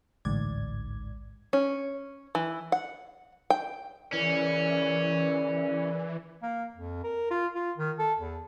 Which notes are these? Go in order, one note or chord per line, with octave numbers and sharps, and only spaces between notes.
A1 D2 G#2 D5 G#6
C#4
E3
F#5
G5
C#3 E3 C#4 A#4 D5
A#3
F2
A#4
F4
F4
D#3
A4
E2